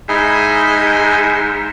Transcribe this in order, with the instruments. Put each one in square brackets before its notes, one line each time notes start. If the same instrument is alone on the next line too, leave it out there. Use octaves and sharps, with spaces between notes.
[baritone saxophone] G#2 [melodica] E4 D#5 G#5